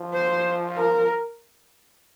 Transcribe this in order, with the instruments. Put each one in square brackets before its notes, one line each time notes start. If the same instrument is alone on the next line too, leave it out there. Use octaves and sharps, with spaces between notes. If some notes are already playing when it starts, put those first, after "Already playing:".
Already playing: [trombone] F3
[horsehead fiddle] C5
A#4